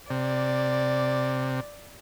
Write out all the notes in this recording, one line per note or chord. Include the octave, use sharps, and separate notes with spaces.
C3 D5